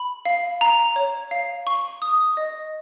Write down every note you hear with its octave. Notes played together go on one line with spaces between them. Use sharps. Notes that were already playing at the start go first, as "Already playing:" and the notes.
Already playing: B5
F5
A#5
C#5
F5
C#6
D#6
D#5